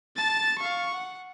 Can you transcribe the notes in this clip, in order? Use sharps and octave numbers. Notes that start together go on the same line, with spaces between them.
A5 A6
F5 C#6
F#5